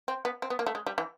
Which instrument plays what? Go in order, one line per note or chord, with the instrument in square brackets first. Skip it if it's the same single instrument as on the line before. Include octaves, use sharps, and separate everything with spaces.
[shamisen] C4
B3
C4
B3
A#3
A3
G#3
G3
E3